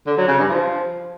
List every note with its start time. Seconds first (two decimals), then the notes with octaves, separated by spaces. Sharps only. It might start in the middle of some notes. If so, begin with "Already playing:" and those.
0.07 D3
0.17 F#3
0.28 C#3
0.39 G2
0.49 F3